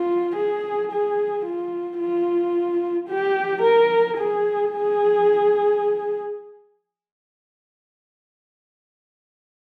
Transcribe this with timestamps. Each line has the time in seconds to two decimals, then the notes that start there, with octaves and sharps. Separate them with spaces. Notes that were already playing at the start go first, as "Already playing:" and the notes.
Already playing: F4
0.36 G#4
0.92 G#4
1.46 F4
1.99 F4
3.09 G4
3.62 A#4
4.17 G#4
4.72 G#4